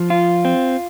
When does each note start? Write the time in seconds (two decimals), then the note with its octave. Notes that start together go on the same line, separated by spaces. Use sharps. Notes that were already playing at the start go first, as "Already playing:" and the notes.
Already playing: F3
0.10 F4
0.45 C4